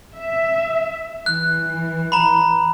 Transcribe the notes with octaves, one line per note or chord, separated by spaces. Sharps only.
E5
E3 F#6
A#5 B5